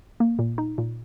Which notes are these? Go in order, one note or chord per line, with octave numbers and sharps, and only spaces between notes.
A#3
A#2
D#4
A#2